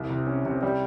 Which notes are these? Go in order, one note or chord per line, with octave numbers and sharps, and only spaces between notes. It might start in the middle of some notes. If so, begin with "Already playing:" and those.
Already playing: C2
C3
C#4
C3
G3